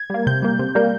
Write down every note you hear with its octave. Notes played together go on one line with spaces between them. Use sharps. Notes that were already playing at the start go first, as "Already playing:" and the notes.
Already playing: G#6
G3 A#3
C3 G6
G3 A#3
C3
G3 A#3